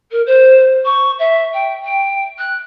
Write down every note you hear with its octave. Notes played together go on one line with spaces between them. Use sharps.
A#4
C5
C#6
E5
G5
G5
F#6